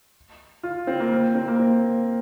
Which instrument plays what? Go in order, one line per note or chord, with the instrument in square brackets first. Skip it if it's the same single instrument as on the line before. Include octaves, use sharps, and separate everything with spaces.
[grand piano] F4
C4
A#3
A#3
C4
A#3
C4